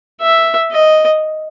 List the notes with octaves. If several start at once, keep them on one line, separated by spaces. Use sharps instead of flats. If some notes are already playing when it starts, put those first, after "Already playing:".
E5
D#5